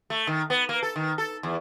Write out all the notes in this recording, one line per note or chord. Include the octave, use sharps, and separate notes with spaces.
A3
D#3
B3
A#3
A4
D#3
A4
E2